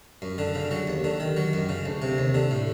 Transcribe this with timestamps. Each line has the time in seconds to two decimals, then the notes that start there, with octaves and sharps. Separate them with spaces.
0.22 F#2
0.38 D3
0.55 C#3
0.71 F#3
0.87 D#2
1.04 D3
1.20 D#3
1.37 F#3
1.53 F#2
1.69 C#3
1.86 D2
2.02 C3
2.18 D#2
2.34 D3
2.51 A2